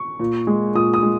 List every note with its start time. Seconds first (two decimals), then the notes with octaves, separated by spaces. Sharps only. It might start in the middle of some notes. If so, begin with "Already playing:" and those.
Already playing: C#6
0.19 A#2
0.47 G#3
0.74 A#2 D#6
0.94 D#6
1.03 G#3